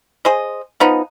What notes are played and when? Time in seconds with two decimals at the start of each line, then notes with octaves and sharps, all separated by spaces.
0.25 G#4 C5 D#5
0.80 F3 B3 D#4